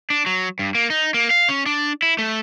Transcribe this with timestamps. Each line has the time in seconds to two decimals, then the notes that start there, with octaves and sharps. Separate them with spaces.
0.10 D4
0.26 F#3
0.59 G2
0.75 A#3
0.90 D#4
1.14 A#3
1.30 F5
1.49 C#4
1.66 D4
2.02 E4
2.19 A3